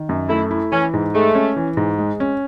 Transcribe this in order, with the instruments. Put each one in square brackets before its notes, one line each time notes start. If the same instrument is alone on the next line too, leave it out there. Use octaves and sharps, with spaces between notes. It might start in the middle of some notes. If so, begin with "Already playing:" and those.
Already playing: [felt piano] D#3
F#2
[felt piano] A3 [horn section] E4
[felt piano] E4
[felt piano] E3 [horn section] C#4
[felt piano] G#2
[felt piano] G#3 [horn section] A3
[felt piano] C#4
E3
G#2
G#3
C#4